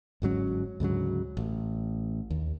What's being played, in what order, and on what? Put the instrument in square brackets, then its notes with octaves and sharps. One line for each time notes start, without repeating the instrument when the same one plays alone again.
[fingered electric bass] G1 G#2 F#3 C#4
D2 G#2 C#3 F#3
A1
D#2